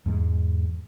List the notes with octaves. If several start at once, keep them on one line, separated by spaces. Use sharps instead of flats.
E2 G#2 G#3